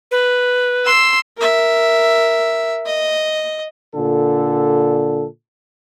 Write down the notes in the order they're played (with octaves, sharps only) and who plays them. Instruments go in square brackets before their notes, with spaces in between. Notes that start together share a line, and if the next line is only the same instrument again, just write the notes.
[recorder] B4
[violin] C6 E6
[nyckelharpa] A#4 E5
D#5
[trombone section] A#2 D3 A4